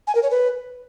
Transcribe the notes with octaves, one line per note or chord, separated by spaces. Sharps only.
G#5
A#4
C#5
B4